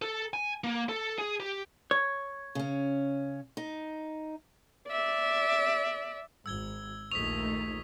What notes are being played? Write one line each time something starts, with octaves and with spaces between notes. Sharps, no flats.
A4
G#5
A#3
A4
G#4
G4
C#5
C#3 C#4
D#4
D5 E5
G#1 E6 G#6 G7
A#1 D#2 D#3 A3 C#6 D#6 B6 F7